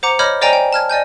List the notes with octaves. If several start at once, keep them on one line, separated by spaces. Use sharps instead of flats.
C5 F#5 A#5 D6
C#5 D#5 B5 D6 F6 G6
C5 D5 D#5 G5 G#5 A#5
G5
A5 F6 G#6
D5 D#5 G#5 G6